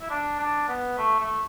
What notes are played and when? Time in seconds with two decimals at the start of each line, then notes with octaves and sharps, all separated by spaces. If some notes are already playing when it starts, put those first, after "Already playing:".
0.01 E4
0.10 D4
0.39 D4
0.68 B3
0.98 A3
1.20 A3